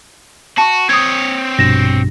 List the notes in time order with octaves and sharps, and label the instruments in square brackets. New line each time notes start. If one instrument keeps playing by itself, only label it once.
[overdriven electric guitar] F#4 [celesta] A5 C#6
[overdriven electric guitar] C4 C#5 [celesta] D#6 G#6
[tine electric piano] A#1 G2 B2 [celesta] A#6 E7